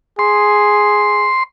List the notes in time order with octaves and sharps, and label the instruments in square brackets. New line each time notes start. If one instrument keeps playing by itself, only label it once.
[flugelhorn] G#4 [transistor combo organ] C6